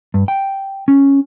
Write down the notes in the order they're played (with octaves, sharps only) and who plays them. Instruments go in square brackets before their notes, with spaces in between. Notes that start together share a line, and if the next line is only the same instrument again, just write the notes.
[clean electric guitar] G2
G5
C#4